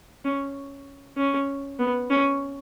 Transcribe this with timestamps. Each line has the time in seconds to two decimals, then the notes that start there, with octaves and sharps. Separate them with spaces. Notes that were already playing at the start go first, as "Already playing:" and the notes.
0.25 C#4
1.17 C#4
1.79 B3
2.10 C#4